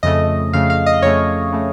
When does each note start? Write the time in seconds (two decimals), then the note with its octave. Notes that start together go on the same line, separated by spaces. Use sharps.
0.03 F2 C#3 A3 D#5
0.53 F2 C#3 A3 F5
0.70 F5
0.86 D#5
1.02 F2 C#3 A3 C#5
1.53 C#3 A3